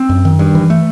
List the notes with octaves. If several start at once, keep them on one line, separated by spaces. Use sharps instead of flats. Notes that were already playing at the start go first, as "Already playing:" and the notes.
Already playing: C4
F#2
D#3
G2
E3
A3